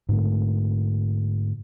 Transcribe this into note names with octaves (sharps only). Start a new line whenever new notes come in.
G#2 D3 A3